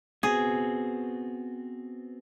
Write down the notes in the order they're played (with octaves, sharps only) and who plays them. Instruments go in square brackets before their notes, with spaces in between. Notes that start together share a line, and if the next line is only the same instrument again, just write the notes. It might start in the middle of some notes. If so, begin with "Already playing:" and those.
[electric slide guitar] B3 C4 F#4 [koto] G#4